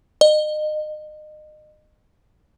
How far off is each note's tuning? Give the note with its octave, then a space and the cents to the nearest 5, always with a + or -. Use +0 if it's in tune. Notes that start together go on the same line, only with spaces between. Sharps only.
D#5 -30